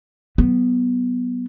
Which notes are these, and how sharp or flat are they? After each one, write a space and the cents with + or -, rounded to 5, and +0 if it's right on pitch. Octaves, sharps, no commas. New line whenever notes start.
F#3 +35 B3 +0